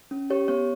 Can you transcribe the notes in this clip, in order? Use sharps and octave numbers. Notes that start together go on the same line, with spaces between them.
C#4
G4 C#5
B3 C#5